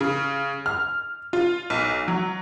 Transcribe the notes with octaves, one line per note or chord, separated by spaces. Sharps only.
C#3
F6
F4
B1
F#3